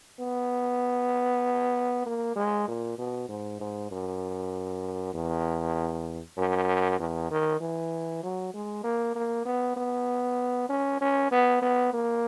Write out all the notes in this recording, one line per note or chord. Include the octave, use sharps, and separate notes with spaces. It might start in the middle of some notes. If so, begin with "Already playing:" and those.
B3
A#3
G#3
A#2
B2
G#2
G#2
F#2
E2
F#2
E2
D#3
E3
F#3
G#3
A#3
A#3
B3
B3
C#4
C#4
B3
B3
A#3